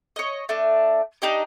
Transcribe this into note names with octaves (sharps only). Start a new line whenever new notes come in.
C#5 D#5
A3 D4
D4 D#4 G4 D#5